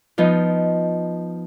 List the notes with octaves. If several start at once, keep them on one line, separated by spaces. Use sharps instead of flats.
F3 B3 D#4